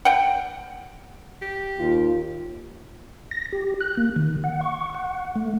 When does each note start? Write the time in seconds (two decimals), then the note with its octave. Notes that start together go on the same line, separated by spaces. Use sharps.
0.05 F#5 G5
1.42 G4
1.79 D#2 F4
3.31 A#6
3.53 G4
3.81 F#6
3.97 A#3
4.16 D#3
4.44 F#5
4.61 C#6
4.94 F#5
5.36 A3